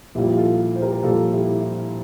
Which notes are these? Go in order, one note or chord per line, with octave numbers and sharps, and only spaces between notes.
A#1 A#2 G3 A#3 E4 G4
F4 A4
C5
G4 A#4
A#1 A#2 G3 A#3 F4 A4
E4 G4
E4